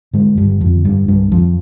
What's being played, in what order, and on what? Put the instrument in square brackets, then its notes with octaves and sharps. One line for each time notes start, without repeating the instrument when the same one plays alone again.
[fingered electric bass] G#2 D3 G#3
G2 G3
D3
F2 F3
D3
G2 G3
C2 G2 G3
F2 F3